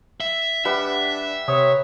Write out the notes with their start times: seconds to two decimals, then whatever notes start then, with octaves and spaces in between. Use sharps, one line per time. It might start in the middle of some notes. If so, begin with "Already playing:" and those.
0.20 E5
0.65 G3 D4 B4 E5 F#5
1.48 C3 C#5 D#6